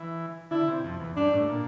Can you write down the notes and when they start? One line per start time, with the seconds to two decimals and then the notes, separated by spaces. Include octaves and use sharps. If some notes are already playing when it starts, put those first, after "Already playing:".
Already playing: E3
0.51 D3 E4
0.67 C3
0.84 F2
0.99 E2
1.16 G2 D4
1.33 A2
1.49 A#2